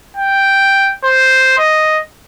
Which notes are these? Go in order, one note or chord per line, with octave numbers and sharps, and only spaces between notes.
G5
C5
D#5